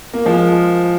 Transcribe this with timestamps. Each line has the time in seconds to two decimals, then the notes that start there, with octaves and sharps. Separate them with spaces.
0.14 A#3
0.26 F3 G#3